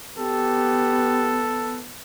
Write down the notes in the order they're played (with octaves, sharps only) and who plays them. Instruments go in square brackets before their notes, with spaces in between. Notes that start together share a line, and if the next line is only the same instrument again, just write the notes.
[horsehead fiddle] B3 [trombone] G4 [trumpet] A4